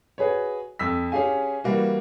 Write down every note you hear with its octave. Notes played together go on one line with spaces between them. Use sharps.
F#4 G#4 B4 C#5
F2 E6 B6
C#4 G4 G#4 F5 G#5
E3 G3 A#3 F#4